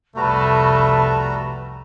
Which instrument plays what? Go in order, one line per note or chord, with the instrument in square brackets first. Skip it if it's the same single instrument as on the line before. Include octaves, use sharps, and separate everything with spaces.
[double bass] F1 C2 [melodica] G3 F#4 A#5 [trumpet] A3 [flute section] B4 A5